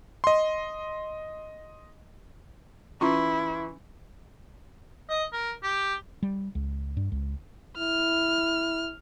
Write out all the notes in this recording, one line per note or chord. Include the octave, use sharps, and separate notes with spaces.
D#5 C6
E3 C#4 E4 F4 C6 C#6
D#5
A#4
G4
G3
C#2
G2
C#2
E4 F6